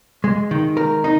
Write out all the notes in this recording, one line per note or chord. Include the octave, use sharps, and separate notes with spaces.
G#3
D#3
A#4
D#4